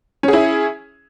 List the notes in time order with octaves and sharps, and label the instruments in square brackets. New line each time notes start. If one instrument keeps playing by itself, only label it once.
[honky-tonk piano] C#4
G#4
E4